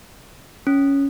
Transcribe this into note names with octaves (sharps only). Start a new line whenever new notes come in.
C#4